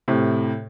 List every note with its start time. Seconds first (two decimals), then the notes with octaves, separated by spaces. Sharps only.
0.08 A2 C3